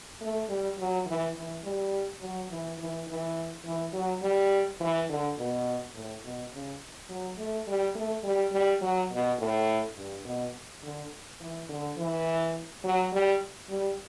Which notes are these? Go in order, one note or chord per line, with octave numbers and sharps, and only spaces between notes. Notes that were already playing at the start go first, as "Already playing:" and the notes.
A3
G3
F#3
E3
E3
G3
F#3
E3
E3
E3
E3
F#3
G3
E3
D3
B2
A2
B2
C#3
F#3
A3
G3
A3
G3
G3
F#3
B2
A2
G2
B2
D3
E3
D3
E3
F#3
G3
G3